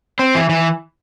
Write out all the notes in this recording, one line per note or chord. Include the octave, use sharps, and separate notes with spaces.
C4
E3
E3